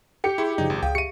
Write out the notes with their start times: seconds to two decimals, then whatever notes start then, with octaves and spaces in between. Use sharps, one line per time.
0.24 G4 D6 C#7
0.38 E4 G#4 C6 C#6
0.58 F#2 C#3 F3 D#4 D5
0.70 G#1
0.83 C#2 F5 G5 D#6
0.95 G4 E5 C#7 D#7